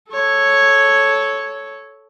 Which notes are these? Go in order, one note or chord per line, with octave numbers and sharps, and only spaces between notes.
A4 C#5